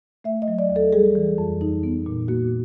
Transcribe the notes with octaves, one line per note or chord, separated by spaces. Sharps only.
A3 E5
D#5
F#3
D5
D#2
A4
G3 G#4
E3
F2
D#4
B3
A#2
A#3 F#4